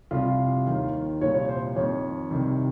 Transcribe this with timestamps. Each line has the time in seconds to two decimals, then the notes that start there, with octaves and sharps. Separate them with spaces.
0.11 C2 C3 F3 F4
0.67 D#2 D#3
1.21 C2 A#2 F3 C#5
1.34 C#5
1.49 C5
1.76 F2 D#3 C#5
2.31 C2 C3 D#3